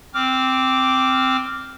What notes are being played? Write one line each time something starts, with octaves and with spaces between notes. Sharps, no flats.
C4 D6 F6